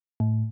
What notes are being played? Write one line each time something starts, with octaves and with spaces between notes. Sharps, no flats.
A2